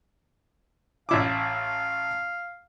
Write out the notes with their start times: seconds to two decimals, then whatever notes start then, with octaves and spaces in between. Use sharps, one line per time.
1.09 A1 E4 F5 D6